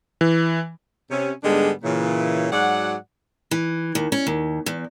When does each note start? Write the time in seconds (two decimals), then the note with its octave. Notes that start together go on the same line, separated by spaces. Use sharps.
0.21 E3
1.11 C3 C#4
1.43 G#2 D3 G3 G#3 B3 D4
1.83 A#2 C#3 E3
2.51 G#2 F#3 F#4 D5 F#5
3.51 E3
3.95 D#2
4.12 C#4
4.27 D#2
4.66 E2